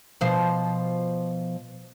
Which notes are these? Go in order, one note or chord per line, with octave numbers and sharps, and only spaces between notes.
B2 F3 C5